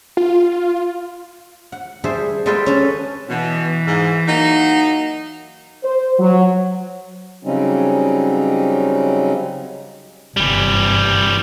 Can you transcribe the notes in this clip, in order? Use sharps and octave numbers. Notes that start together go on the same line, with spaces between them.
F4
F#5
G3 G#4 C5 E5 A5
G3 G#3 F4 A4 B4 G5
C#4 A4 B4
B2 E3
G#2
F#3 A#3 D#4
C5
F#3
C#3 F#3 G3 C4 C#4 D#4
G1 F#2 C3 E3 G3